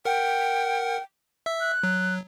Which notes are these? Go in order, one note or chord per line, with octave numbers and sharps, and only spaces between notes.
A#4 F#5 G5
E5 E6
F#6
F#3